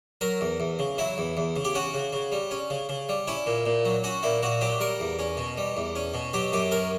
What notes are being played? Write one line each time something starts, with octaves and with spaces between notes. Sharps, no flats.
F#3 A#4
E2
E2
C#3
F#3 E4
E2
E2
C#3
G4
C#4 F#4
C#3
C#3
G3
C#4
C#3
C#3
G3
C#4 E4
A#2
A#2
F#3
C#4 F#4
A#2 E4
A#2 F#4
F#3 G4
G3 A#4
E2
C#4
B2
G3
E2
C#4
B2
F#3 G4
F#2 G4
C#4 A#4